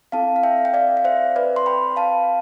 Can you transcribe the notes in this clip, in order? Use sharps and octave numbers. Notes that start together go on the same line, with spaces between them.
C4 E4 A4 F5 A5
F5
E5 G5
G5
D5 F5
F5
C5 E5
B4 D5
C6
G5 B5
F5 A5